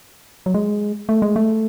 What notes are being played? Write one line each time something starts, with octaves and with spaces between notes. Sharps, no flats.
F#3
G#3
A3
G#3
A3